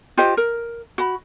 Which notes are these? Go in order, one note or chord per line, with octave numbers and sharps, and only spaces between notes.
F4 G4 C5 D#5
A#4
F#4 B5